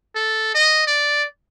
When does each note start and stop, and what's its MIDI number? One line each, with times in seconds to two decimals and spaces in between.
0.15 0.50 69
0.55 0.86 75
0.87 1.25 74